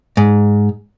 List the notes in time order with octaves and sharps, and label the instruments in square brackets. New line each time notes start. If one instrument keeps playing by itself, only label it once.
[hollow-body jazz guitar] G#2